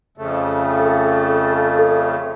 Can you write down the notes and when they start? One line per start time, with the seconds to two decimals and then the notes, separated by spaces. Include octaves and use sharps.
0.18 F2 C#3 A3
0.79 A4